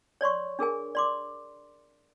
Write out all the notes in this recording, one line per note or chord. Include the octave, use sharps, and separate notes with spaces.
C#5 D5 C6 C#6
D4 G#4 A#4 G#5
D5 C6 D6